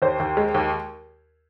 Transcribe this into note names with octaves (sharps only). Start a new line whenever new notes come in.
D#2 C5
D#2
G#3
D#2